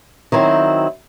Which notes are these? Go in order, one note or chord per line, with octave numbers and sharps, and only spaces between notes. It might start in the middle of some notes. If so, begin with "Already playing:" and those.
D#3 F#3 C4 E4 C5